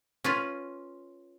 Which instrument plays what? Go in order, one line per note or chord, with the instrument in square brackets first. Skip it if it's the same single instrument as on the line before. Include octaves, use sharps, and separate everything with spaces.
[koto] C#4 F4 B4